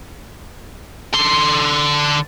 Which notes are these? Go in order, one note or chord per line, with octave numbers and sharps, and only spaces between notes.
D3 C6